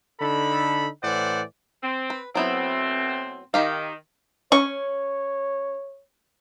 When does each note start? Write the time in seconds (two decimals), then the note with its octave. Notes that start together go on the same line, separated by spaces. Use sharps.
0.20 D3 D#4 A4 B5
1.03 A2 E3 C5 D5 F#5
1.82 C4
2.10 B4
2.35 B2 F#3 A3 B3 C4 E4
3.54 D#3 D#4 G4 F5
4.52 C#4 C#5 C#6